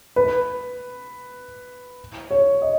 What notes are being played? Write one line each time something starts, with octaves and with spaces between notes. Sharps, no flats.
B4
C#5
D#5